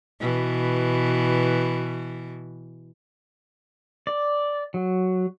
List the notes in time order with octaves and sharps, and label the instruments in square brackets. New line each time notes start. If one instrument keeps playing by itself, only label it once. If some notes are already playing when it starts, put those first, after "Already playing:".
[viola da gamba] B2 E3
[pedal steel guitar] D5
F#3